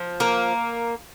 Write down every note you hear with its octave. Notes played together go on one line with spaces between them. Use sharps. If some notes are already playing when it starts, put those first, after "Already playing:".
Already playing: F3
A#3